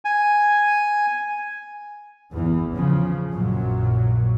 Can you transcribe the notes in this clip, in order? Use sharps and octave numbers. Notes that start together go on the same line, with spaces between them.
G#5
A1 E2 E3
C#3 F3
A#1 F#2 A#2 F#3